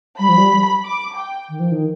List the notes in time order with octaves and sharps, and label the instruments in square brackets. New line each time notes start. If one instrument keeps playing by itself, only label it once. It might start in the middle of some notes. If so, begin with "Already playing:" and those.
[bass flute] G3 [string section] B5
[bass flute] F3
G3
[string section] D6
G5
[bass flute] D#3
F3
D#3